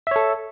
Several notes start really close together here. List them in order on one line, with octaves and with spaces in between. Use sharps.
E5 C#5 A4